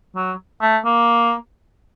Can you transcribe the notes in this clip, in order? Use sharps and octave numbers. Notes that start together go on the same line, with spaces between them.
F#3
A3
A#3